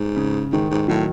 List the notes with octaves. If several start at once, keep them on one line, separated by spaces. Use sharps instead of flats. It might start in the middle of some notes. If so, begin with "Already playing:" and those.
Already playing: G#2
C#3
G#2 D#3
G#2
A2 D#3 F#3